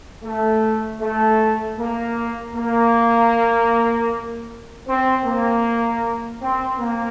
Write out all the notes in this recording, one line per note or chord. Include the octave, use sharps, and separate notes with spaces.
A3
A3
A#3
A#3
C4
A#3
C4
A#3